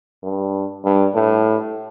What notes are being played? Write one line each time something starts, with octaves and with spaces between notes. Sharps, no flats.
G2
G2
A2